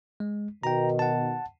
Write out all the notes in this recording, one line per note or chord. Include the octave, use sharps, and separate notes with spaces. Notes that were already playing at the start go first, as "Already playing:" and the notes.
G#3
B2 D#3 G5 A#5
F#5 A5